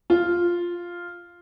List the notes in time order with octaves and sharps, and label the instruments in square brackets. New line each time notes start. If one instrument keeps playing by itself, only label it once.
[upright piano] F4